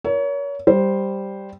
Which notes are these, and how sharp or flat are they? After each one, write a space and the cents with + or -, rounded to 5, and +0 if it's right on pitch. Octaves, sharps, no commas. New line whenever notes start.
A#4 +20 C#5 +30
G3 +0 C5 +0